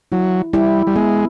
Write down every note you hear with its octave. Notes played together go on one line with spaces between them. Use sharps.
F#3 E4
G3 E4
G3
G#3 B3